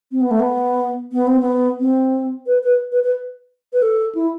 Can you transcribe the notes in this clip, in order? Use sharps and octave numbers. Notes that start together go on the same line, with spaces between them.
C4
B3
A3
B3
B3
C4
B3
C4
B4
B4
B4
B4
B4
A4
E4